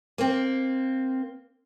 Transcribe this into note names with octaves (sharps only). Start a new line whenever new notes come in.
A#3 C4